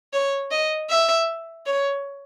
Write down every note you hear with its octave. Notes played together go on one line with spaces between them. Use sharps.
C#5
D#5
E5
C#5